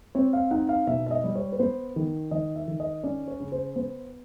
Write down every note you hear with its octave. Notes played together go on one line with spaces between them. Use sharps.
C4 C#5
F5
D#4 F#5
F5
B2 E5
E5
D#5
G3
C#5
B4
B3 C5
D#3
D#3 D#5
E5
D#3
D#5
C#4 D5
C#5
C#3
C5
B3 C5